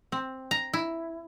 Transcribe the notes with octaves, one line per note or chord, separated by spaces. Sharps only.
C4
A#5
E4